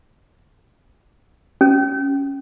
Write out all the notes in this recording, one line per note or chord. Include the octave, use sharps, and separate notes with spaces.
C#4